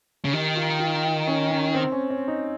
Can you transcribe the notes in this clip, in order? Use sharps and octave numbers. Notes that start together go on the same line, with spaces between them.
C#3
D#3 G4
F4
F4
C#4
C#4
C4
C#4
C#4
D#4